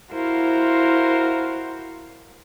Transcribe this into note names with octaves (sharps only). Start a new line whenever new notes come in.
E4 F#4 A#4 C5 F5